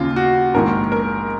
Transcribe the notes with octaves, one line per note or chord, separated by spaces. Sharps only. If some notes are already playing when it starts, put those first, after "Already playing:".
Already playing: D#2 C#3 F4
F#4
A#1 G#2 D#3 A#4
A#4